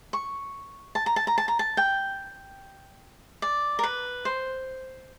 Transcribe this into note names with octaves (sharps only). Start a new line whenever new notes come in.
C#6
A5
A#5
A5
A#5
A5
A#5
A5
G5
D5
A#4
B4
C5